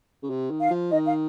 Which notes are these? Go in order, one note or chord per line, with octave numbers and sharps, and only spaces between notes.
C#3
C3
D#3
F5
F3
D#3 D#5
F5